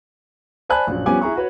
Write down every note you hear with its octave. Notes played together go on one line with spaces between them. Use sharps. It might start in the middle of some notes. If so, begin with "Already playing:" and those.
C5 D5 G#5 A5 B5 F#6
A#1 F#2
F3 G3 B3 C#4 G#5 D6
E4 G#4 A#5 C#6
F#4 B4 C#5